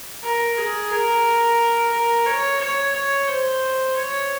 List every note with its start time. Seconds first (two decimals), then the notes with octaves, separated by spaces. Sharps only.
0.23 A#4
0.58 G#4
0.91 A#4
1.93 A#4
2.26 C#5
2.59 C#5
2.94 C#5
3.27 C5
3.95 C#5